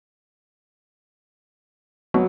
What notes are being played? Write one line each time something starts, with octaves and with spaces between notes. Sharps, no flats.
F#3 B3